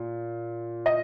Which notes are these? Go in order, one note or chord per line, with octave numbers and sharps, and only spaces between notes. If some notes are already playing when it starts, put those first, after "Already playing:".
Already playing: A#2
D#5